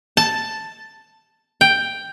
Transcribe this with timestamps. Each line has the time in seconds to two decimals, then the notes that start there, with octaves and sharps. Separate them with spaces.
0.17 A5
1.61 G5